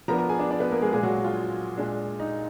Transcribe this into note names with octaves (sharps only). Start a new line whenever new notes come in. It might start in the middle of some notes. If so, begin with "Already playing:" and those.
F3 B3 D4 A#4 A#5
A#4 A#5
G#4 G#5
D4 D5
D4 D5
B3 B4
A#3 A#4
G#3 G#4
A#2 G#3 D4 G#4
F#3 F#4
F4
A#2 G#3 D4
D#4